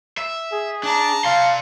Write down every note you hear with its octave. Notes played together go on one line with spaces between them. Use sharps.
E5
G#4
D4 A5 A#5
D5 F5 C6